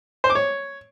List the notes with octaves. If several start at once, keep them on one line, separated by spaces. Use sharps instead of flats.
C5
D6
C#5